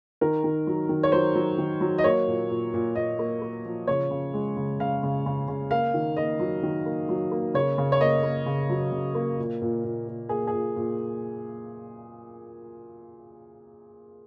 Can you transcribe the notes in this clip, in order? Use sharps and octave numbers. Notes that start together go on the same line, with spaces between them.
D#3 A#4
D#3
F#3
D#3
C#5
F#3 C5
F#3
D#3
F#3
D#5
A#3 C#5
A#2
A#2
A#2
A#2 D#5
A#3
A#3
F3
C#3 C#5
C#3
G#3
C#3
C#3 F5
C#3
C#3
C#3
A#3 F5
D#3
A#3 D#5
F#3
D#3
A#3
F#3
A#3
C#3 C#5
C#3
C#5
A#3 D#5
A#3
C#3
F#3
C#3
A#3
A#2
A#2
A#2
A#2
A#3 G#4
G#4
A#2
A#2